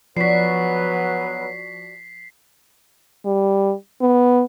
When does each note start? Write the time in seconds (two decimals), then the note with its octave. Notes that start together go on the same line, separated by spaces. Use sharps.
0.17 F3 F#3 B3 D4 F#4 B4 B6 C7
3.26 G3
4.01 B3